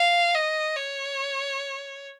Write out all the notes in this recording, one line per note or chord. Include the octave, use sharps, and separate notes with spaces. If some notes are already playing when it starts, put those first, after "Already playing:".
Already playing: F5
D#5
C#5